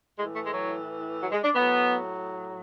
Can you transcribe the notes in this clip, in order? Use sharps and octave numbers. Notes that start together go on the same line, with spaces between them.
A2 G#3
E3
A3
G#3
F#3
F#3
G#3
D4
A2 F#3 B3